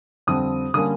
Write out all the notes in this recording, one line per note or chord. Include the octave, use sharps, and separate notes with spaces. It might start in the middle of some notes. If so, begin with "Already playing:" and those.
F2 D3 G3 C4 D#6
D3 G3 A#3 C#4 D#6